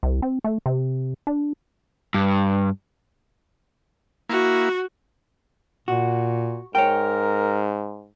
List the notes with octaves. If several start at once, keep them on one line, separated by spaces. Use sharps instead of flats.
C2
C4
A3
C3
D4
G2
A#3 E4 F#4
A#2 F#4
G#2 A#4 C#5 G5